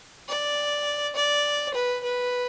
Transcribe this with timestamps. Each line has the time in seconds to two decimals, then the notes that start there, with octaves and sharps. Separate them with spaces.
0.28 D5
1.16 D5
1.74 B4
2.03 B4